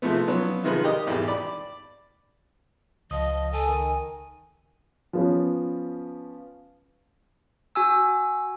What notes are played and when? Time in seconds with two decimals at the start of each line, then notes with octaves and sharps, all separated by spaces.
0.02 C3 F3 G#3 A3 B3
0.27 F3 F#3 B3 C#4
0.64 C3 D#3 F3 G#3 B4
0.84 G4 A#4 D#5
1.07 G#1 E2 G4
1.28 D5 B5
3.11 C#2 F3 D#5 D#6
3.33 F3
3.53 A4 G#5
3.67 D#3
5.13 F3 B3 C#4
7.75 F#4 G#5 E6